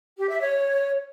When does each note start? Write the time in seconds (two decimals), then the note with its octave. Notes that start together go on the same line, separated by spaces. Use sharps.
0.17 G4
0.29 E5
0.41 C#5